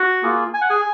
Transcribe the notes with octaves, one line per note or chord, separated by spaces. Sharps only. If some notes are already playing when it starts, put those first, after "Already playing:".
Already playing: F#4 F#5
A#3 F4 G#4
G#5
F#5
G#4 G#5